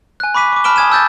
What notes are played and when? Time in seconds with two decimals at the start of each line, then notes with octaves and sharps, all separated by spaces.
0.20 G#5 F#6
0.34 B5 C#6 D6 B6 D#7
0.52 C#6 D6
0.64 A5 B5 F6 D7 E7 G7
0.76 G#5 D#6 G#6 D#7 E7
0.90 A5 E6 G6 A6